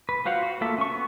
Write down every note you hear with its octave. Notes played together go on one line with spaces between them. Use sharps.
B4
F4 F#4 C5 F5 F#5
F#4
A3 A#3 F4 A4 E5
C#4 C#6
B3